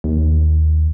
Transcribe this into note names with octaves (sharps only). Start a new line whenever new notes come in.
D#2